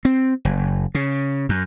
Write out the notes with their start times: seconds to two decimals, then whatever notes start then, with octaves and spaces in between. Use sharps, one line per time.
0.05 C4
0.45 F#1
0.95 C#3
1.49 F#2